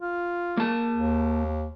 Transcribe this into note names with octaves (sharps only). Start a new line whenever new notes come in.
F4
A#3 A5
D#2